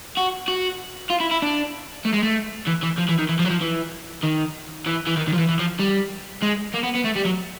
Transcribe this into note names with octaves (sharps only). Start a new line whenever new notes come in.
F#4
F#4
F4
E4
E4
D4
A3
G#3
A3
E3
E3
F3
E3
D#3
E3
F3
F#3
F3
E3
D#3
E3
E3
D#3
D#3
F3
E3
E3
F3
G3
G#3
A#3
B3
B3
A3
G3
F#3